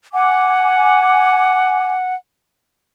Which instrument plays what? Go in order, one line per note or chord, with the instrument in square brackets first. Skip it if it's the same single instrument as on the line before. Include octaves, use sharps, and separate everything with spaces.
[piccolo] F#5 [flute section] G#5 D6